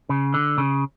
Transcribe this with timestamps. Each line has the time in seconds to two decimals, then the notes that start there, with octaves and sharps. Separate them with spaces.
0.09 C#3
0.34 D3
0.58 C#3